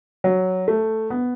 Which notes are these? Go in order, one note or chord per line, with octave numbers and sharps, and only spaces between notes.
F#3
A3
B3